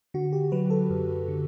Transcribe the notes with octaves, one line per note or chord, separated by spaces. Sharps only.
D3 F#4
G4
F#3 B4
A4
F#2
D3